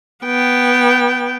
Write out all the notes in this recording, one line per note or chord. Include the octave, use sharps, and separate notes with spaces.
B3 G5